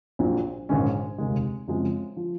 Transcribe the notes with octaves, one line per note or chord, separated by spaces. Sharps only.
A#1 A#2 F#3
A#1 G#2 D#3 G#3 C#4
F1 D#2 D#3 G#3
F#2 C#3 F3 G#3 C4
F3